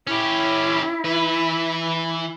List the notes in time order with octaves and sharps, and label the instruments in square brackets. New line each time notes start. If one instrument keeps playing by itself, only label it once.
[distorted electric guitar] C#4 G4 [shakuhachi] E4
[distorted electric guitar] E3 B4